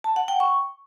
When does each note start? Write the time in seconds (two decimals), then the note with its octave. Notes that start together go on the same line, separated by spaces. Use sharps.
0.04 A5
0.16 F#5
0.28 G5
0.40 C#6